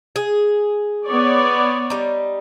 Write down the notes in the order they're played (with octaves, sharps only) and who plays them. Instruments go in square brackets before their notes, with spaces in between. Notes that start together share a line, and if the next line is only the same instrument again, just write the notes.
[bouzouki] G#4
[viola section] B3 C#5 D5
[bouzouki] G3 D#4